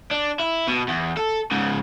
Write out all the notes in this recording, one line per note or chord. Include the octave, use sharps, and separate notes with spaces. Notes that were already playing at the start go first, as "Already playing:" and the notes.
D4
E4
B2
E2
A4
G#2 C#3